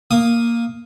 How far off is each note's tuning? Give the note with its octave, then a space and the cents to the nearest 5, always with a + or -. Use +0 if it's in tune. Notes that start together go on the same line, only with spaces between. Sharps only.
A#3 +0 D#6 +0